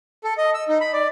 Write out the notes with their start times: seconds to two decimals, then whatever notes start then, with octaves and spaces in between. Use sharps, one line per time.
0.24 A4
0.38 D#5
0.54 E6
0.68 D#4
0.81 B5
0.93 D5